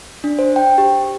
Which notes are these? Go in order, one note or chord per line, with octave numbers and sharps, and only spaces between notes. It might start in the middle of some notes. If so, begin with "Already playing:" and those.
D4
C5
G5
G4